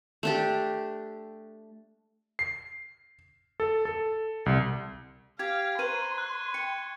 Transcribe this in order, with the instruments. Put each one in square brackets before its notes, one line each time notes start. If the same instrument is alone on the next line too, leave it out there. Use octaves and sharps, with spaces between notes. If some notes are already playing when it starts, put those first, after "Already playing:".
[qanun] A3 D4 G4
[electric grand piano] C7
A4
A4
C2
[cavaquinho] G4 [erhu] F5 [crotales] G#6
[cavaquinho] B4 C5 A#5 [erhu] C6 [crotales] C#6 D#7
[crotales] F#6
[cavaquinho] G5 [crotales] C#7